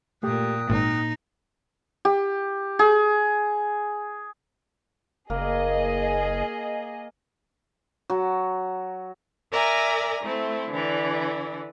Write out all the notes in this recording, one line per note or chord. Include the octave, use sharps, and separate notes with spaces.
A#2 A3 G4 G5 D#6 F#6
G#1 A#2 A#3 D#4
G4
G#4
F#1 A#3 G#4 D#5
F#3
A#4 D5 E5 G#5 A#5
A3 C4 E4
D3 E3 D5